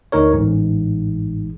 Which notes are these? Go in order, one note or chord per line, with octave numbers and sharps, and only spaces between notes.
D2 D#4 A#4 C#5
A1 G#2